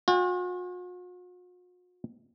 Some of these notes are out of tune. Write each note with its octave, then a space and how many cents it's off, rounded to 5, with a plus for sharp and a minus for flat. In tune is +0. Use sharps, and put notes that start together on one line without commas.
F#4 -45 G5 +40